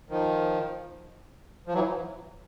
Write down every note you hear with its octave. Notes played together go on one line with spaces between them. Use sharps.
D#3 F3
F3
E3 F#3